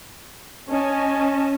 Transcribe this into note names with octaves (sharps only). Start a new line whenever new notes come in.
C#4 D#5 G#5 A5